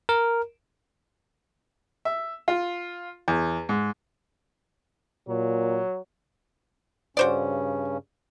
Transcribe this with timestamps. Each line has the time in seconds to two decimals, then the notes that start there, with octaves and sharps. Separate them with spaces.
0.09 A#4
2.05 E5
2.48 F4
3.28 E2
3.69 G#2
5.29 A#2 F#3
7.17 G2 C#3 C#4 F#4 C5 D5